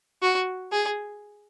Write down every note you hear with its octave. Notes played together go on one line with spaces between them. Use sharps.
F#4
G#4